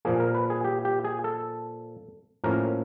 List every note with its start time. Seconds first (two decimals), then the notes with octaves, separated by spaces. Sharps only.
0.05 A#2 F3 A#3 G#4
0.20 A#4
0.35 B4
0.50 G#4
0.64 G4
0.85 G4
1.05 G#4
1.24 A4
2.44 A2 F3 A#3 C#4 A#4